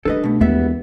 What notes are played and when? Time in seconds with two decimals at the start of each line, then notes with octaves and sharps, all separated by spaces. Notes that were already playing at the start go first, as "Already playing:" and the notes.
0.05 G2 D#3 D#4 A4 B4 D#5
0.24 B2 A3
0.41 E1 D#2 G3 B3 E5